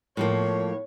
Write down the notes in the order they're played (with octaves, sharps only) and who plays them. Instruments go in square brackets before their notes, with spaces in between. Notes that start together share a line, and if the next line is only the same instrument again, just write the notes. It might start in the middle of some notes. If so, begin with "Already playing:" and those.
[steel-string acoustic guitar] A2 F3 A#3 [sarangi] C#5